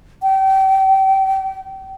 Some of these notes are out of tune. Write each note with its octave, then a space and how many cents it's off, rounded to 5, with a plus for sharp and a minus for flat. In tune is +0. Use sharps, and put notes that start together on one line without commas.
G5 -30